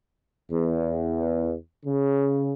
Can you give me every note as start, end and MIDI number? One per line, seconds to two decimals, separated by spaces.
0.51 1.54 40
1.85 2.52 49